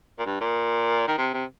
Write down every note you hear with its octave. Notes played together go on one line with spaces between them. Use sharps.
A#2
G2
A#2
D#3
C3
C3